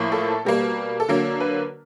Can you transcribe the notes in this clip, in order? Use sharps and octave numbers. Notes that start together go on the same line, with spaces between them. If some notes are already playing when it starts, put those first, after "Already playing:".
Already playing: A2 F3 A#3
A4
B2 G3 A#3
A4
D3 F#3 A#3 A#4
B4